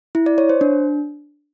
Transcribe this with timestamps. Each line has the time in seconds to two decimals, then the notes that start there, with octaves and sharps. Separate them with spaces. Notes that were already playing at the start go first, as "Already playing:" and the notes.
0.15 E4
0.26 D5
0.38 C#5
0.49 C5
0.61 D4